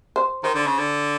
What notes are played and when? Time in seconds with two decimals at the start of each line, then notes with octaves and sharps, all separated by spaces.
0.16 C5
0.43 D#3 C5
0.55 D3
0.66 C#3
0.78 D3